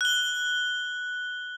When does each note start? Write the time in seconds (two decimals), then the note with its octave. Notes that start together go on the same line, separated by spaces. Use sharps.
0.01 F#6 G7